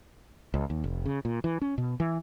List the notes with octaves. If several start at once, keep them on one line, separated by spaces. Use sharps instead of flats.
C#2
D#2
F1
C#3
A#2
E3
C#4
B2
E3